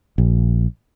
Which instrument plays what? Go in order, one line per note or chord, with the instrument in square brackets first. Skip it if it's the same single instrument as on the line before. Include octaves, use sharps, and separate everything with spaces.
[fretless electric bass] A#1